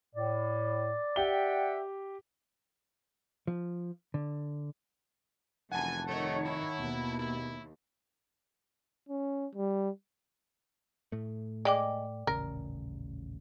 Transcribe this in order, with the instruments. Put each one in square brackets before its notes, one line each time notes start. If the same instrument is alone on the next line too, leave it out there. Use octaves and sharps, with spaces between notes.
[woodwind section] A2 [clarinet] D5
[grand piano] G4 G7 [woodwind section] E5 F#5 G5
[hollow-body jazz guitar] F3
D3
[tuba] F1 [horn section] F#2 G#5 [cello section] E3 [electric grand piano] F#5 A5
[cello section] D#3 C#5 [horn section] A3
[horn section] E4
[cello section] D#2 [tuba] B2
[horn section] E4
[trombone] C#4
G3
[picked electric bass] A2 A3
[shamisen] G#3 [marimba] D5 G5 D6
[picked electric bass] D#1 A1 C#3 [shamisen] A#4